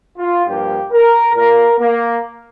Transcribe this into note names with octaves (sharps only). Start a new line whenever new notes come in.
F4
G2 F3 A#3 G4
A#4
A#2 A#3 A#4
A#3